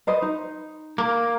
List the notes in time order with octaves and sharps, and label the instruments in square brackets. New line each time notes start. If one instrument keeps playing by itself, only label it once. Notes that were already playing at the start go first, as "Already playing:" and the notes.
[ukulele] B4 C5 D#5
D#4
[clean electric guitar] A#3